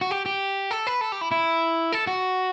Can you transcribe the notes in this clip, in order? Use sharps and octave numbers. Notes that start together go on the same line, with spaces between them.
F#4
G4
G4
A4
B4
A4
G4
E4
E4
A4
F#4